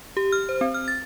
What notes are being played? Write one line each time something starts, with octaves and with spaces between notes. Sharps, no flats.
G4
F6
C5
C4
F6
A6